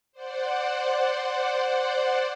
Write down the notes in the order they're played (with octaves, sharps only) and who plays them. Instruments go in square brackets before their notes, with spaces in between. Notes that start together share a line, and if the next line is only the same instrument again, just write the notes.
[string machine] C5 D5 F#5